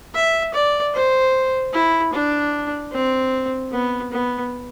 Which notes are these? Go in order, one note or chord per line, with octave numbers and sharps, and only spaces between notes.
E5
D5
C5
E4
D4
C4
B3
B3